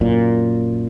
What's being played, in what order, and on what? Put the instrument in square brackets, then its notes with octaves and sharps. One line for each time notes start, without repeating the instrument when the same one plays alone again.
[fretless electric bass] F#2 A#2